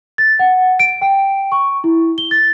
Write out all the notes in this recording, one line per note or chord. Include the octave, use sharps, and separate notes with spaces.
A6
F#5
D7
G5
C#6
E4
G7
A6